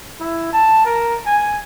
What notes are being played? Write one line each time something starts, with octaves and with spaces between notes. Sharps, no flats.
E4
A5
A#4
G#5